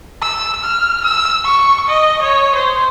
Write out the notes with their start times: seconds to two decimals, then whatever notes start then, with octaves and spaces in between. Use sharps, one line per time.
0.22 E6
0.64 F6
1.04 E6
1.45 C#6
1.89 D#5
2.23 C#5
2.56 C5